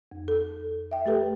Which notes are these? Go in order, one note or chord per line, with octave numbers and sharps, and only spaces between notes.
F2
A4
E5 G5
A3 G4 A4 B4